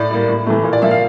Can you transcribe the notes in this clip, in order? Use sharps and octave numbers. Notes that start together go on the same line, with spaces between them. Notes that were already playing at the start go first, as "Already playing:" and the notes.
Already playing: A2 D5
G3 A#3
A2
E3 A3
A#2
D5
F3 A#3 E5
F5